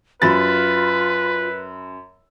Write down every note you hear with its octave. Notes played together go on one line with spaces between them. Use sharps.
F#2 F4 B4 B5 A6